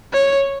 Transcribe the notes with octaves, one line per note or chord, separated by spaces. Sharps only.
C#5